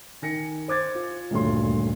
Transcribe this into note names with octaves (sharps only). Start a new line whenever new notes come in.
D#3 G#5 A#6 C#7
C5 D6 G#6 A6
F4
D#1 D2 G2 F#3 C6